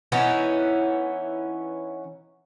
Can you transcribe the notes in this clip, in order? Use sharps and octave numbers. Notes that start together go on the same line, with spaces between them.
E3 B3 C#4 D#4